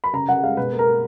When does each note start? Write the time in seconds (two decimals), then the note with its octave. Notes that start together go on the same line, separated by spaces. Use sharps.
0.04 B5
0.13 C#3 A#5
0.29 C#3 F#5
0.43 G#3 F5
0.57 B2 B4
0.72 A#3
0.79 A#4
0.87 A#3